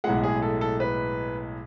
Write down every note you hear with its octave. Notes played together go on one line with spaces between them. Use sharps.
B1 A2 G#3 F#5
G#4
A4
A4
B4